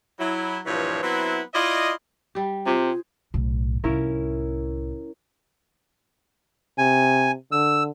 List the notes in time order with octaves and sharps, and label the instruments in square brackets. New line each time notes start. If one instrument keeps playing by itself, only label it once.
[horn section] F#3 E4
G2 A#2 E3 F3 C#5
F#3 B3 C4 E4
E4 F4 D5 D#5
[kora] G3 G4
[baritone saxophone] C3 [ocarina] F4 [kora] G#4 C5
[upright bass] B1 A2
[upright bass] C2 A2 [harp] C#4 E4 A#4
[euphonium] C3 [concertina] G#5
[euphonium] D3 [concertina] E6